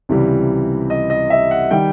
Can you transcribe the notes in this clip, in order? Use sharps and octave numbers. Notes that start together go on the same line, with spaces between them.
C#2 C3 E3 G3
D#5
D#5
E5
F#5
D#3 G3 G5